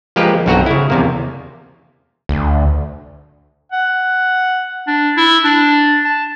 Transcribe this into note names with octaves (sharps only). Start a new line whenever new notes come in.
F3 G#3 A#3 G4 B4
B1 G2 C4 F#4 F#5 A#5
C#3 E4
E2 C3 A#3
D2
F#5
D4
E4
D4
A5